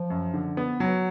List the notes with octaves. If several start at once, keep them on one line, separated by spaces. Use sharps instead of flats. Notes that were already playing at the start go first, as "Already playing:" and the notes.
Already playing: F3
F#2
D3
B3
F#3